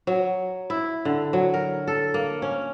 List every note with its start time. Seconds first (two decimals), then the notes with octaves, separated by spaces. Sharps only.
0.07 F#3
0.70 E4
1.05 D3
1.33 F#3
1.54 A#4
1.87 A4
2.14 A#3
2.42 C#4